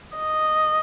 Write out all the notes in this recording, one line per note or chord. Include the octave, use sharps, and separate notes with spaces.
D#5